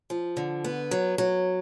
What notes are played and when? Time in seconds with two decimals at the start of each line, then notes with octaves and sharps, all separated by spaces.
0.10 F3
0.37 D3
0.64 B3
0.91 F#3
1.18 F#3